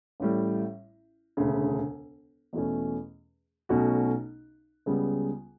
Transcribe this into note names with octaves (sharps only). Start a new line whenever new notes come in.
A1 A2 G3
E1 D2 C#3
E2 B2 A3 C#4
B1 B2 A3 C#4 F#4
C#2 C#3 G3 B3